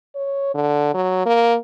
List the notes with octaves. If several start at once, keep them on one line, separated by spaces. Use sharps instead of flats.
C#5
D3
F#3
A#3